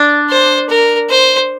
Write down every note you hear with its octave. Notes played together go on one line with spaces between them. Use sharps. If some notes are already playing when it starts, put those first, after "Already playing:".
Already playing: D4
C5
A#4
C5